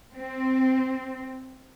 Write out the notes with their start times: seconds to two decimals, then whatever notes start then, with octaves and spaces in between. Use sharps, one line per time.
0.16 C4